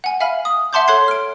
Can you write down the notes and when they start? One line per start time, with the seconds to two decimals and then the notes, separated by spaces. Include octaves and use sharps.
0.04 F#5 G#5
0.20 E5 F5 G#5 B5 F6
0.45 D#6
0.73 E5 F#5 A5 C6 D6 G6
0.88 A4 C#5 C6 F#6 G#6 C7
1.08 F6 D7